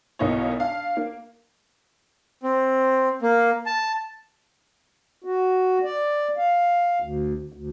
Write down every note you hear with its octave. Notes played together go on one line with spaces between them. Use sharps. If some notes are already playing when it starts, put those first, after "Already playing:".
B1 A#3 B3 D#4 E4 C#5
D4 F5
A#3
C4
A#3
A5
F#4
D5
F5
D2
D2